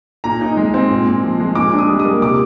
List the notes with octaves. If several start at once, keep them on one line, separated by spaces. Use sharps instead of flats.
A#2 A#5
D#4
G#3
C4
A#2
A#2
F3
G#3
A#2 D6
D4
D#6
G3
D#6
A#3
C3 D6